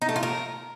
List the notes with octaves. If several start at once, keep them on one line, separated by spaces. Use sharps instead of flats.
D#4
A3
F4
A#4